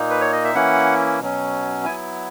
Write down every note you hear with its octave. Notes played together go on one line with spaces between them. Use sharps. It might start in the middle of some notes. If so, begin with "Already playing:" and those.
Already playing: A#2 A#3 D#4
B4
C#5
D#5
E5
E3 A#3 C#4 E4 F#5
B2 F#3 C#4
F#3 B3 E4 G#5